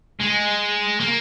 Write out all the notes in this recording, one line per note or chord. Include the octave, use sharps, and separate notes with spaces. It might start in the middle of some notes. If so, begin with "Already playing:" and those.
G#3
A#3